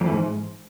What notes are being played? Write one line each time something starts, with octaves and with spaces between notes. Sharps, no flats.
F2
E3
G#2